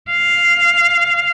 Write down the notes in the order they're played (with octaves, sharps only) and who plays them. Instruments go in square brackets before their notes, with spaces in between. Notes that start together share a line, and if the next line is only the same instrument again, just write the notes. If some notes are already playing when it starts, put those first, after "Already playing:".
[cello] F5